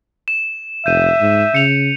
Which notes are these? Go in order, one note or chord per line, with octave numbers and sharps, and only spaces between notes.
E7
F1 E5 G6 D#7
G#2
C#3 C#7 F7